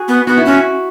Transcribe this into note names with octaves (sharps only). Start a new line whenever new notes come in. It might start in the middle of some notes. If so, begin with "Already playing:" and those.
Already playing: F#4 G#4
B3
B3 F#4
E4
C#4 F#4